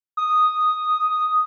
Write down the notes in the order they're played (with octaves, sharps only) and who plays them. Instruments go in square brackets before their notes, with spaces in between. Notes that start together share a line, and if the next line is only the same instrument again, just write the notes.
[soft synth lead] D#6